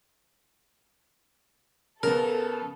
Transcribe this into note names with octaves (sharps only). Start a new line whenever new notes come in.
C#3 B3 A4 A#4